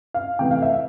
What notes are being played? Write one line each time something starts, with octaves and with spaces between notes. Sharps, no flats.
F5
C3 E3 A3 C4 G5
F5
E5